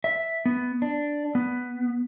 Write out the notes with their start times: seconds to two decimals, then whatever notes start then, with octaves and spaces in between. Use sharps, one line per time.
0.04 E5
0.46 B3
0.82 D4
1.35 B3